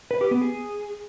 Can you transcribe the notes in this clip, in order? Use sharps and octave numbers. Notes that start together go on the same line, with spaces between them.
B4
G4
B3
G#4